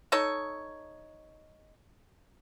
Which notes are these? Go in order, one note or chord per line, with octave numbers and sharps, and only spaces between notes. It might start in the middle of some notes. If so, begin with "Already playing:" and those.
D#4 A4 C#5